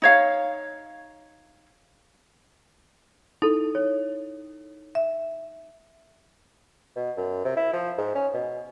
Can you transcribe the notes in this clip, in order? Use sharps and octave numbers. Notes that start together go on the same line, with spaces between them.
D#4 C#5 F5
D#4 E4 A4
C#5
E5
B2
F#2
C3
E4
F3
G#2
C#4
B2